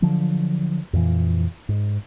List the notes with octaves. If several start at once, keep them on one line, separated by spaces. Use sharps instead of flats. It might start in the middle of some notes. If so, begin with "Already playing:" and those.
D3 F3 F#3
F2 A#2 E3
G#2